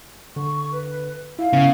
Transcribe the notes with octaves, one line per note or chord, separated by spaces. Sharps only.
D3 C#6
B4
E4 F5
C#3 B3 C#4 E4